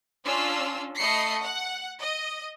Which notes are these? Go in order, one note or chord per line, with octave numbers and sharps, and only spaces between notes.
C#4 D4 F4 E6
A3 D#5 B5 C7 C#7
F#5
D#5